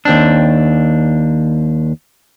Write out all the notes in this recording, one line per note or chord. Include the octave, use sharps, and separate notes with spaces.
D#2 C4 D4